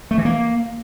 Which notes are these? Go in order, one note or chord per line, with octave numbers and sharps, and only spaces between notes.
A3
E3
A#3